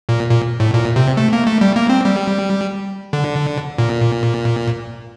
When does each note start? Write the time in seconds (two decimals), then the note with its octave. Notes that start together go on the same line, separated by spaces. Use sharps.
0.09 A#2
0.30 A#2
0.60 A2
0.74 A#2
0.96 C3
1.17 A3
1.33 A#3
1.47 A3
1.61 G3
1.76 A#3
1.90 C4
2.05 G3
3.13 D3
3.78 A#2